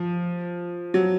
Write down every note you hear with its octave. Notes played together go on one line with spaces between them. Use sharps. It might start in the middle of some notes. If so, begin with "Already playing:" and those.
Already playing: F3
F#3